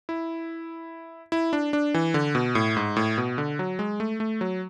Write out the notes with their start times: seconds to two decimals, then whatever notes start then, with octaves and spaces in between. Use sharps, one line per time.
0.09 E4
1.32 E4
1.53 D4
1.73 D4
1.94 E3
2.14 D3
2.35 B2
2.55 A2
2.77 G#2
2.96 A2
3.18 B2
3.38 D3
3.59 F#3
3.79 G#3
4.00 A3
4.20 A3
4.41 F#3